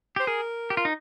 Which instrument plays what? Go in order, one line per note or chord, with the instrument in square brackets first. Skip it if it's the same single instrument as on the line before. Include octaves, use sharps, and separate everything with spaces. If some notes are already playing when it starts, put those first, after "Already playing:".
[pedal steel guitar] G4 [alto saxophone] C5
[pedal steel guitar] G#4 [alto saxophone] A#4
[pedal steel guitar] G4
F4
D#4